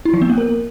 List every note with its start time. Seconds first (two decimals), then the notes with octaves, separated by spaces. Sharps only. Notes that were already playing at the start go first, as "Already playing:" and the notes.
0.05 E4
0.14 F3
0.22 B3
0.30 A#3
0.38 A#4